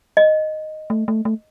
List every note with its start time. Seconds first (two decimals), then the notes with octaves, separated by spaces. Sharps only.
0.17 D#5
0.90 A3
1.08 A3
1.25 A3